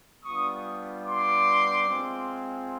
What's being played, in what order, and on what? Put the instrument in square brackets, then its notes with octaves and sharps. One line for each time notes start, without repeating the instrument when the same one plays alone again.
[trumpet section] G3 B3 D4 F4 C#6 D#6
C6 D6
G#3 C4 F4